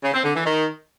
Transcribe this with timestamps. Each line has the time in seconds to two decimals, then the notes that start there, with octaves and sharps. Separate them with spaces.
0.02 C#3
0.13 C4
0.23 D3
0.33 E3
0.44 D#3